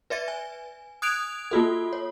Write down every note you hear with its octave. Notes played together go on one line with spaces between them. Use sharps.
B4 D5 E5 A6
G#5
D#6 F#6 G#6 D7 F7
A#3 F4 F#4 A4
C#5